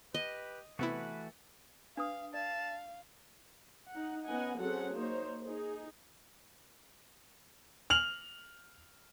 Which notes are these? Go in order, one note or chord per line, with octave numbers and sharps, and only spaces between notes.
G4 B4 D#5
C3 E3 A3 B3 E4 F#4 B4
D4 B4 F5 D#6
D5 F5 A5
D#4 F#5
B3 C#4 D#4 D#5 F#5 G#5
F#3 C4 C#4 G#4 A4 F#5
A#3 D#4 C5 C#5
D#4 G#4
F6 F7 F#7